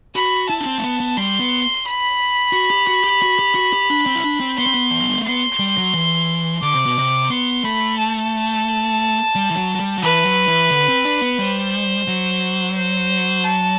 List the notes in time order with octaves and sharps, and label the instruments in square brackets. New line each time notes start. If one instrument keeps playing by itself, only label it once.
[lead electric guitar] F#4 [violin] B5
[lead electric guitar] E4 [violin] A5
[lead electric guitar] D4
C4
A3
B3
B3
[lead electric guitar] G3 [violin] C6
[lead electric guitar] B3
[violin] B5
[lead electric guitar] F#4
G4
F#4
G4
F#4
G4
F#4
G4
D4
C4
E4
D4
C4
[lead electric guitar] B3 [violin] C6
[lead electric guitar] C4
B3
E3
F#3
G3
A3
[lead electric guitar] B3 [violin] C6
[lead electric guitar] G3
F#3
E3
[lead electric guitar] D3 [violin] D6
[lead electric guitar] C3
B2
C3
[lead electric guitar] B3 [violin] C6
[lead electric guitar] A3 [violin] B5
[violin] A5
[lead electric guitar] G3
E3
F#3
F#3
G3
F#3
[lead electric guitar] E3 [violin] B4
[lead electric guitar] F#3
E3
D3
C4
D4
B3
[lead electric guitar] G3 [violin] C5
[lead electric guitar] F#3
[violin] C5
A5